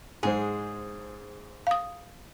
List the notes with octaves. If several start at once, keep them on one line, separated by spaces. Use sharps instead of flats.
G#2 G#3 G#4 C5
F5 D#6